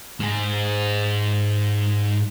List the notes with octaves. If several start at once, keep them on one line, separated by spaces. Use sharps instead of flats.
G#2 G#4